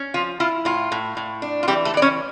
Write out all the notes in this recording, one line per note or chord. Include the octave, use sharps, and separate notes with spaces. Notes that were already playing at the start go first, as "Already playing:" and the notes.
Already playing: C#4
F3 F4
E4 F4
A2 F4
A2
A2
D4
F4
E3 G3 G4
A3 A4
E3 D5
C#4 C#5